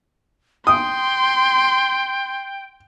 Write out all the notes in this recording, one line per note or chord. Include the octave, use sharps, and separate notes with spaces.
G5 C6 D#6